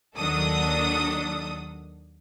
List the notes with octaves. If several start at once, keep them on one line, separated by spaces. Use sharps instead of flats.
D#2 D#3 F#3 D4 A4 D#6